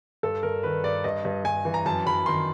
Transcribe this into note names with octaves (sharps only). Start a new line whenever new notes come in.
G2 A4
G2 A#4
D#3 B4
G2 D5
G2 D#5
G2
G2 G#5
E3
A#5
F#2 A5
F#2 B5
D#3 C6